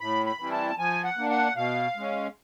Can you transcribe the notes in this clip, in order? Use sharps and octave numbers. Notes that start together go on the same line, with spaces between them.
A2 B5
B5
E3 G3 C4 E4
A5
F3 G#5
F#5
A#3 D4
F#5
B2 F5
G#3 C#4